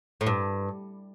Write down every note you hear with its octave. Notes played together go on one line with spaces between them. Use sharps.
A2
G2